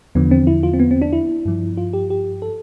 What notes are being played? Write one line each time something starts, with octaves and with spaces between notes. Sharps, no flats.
E2 D3 F3 B3
C4
E4
F4
C4
B3
C4
D4
E4
G2 F3
F4
G4
G4
A4